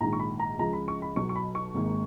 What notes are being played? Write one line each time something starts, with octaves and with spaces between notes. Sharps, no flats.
A#1 G#2 D#3 A#5
C#6
B5
A#5
C#2 C#3 F3 A#5
B5
C#6
B5
B1 B2 F#3 C#6
C#6
B5
C#6
G#1 G#2 D#3 A#3